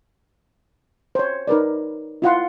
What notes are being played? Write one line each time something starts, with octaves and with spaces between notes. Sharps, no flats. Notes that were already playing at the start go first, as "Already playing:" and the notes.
C5 C#5
D#4 A#4 B4 D5
E4 F4 F#5 C6